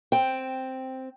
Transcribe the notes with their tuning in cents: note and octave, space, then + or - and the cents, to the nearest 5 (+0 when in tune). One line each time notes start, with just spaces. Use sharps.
C4 +0 G5 +0